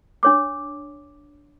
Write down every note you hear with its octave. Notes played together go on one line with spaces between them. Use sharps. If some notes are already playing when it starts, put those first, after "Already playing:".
D4 C#5 D6